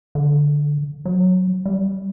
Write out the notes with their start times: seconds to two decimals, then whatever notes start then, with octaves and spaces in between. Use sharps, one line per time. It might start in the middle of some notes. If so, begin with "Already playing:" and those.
0.15 D3
1.05 F#3
1.66 G3